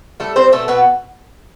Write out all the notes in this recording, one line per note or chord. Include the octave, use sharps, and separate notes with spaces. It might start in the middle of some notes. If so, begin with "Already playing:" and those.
G3 A3 A4
G3 C4 C5
B2 A3 A4
B2 B3 B4